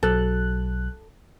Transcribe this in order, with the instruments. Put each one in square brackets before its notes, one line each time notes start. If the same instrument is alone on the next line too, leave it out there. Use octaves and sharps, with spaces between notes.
[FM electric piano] B1 F#3 F#6 [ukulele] A4